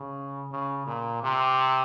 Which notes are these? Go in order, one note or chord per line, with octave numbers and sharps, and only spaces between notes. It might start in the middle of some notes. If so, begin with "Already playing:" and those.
Already playing: C#3
C#3
A#2
C3